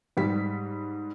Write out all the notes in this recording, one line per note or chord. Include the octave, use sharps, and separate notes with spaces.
G#2 G3 B6